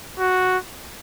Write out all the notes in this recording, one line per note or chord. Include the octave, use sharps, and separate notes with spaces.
F#4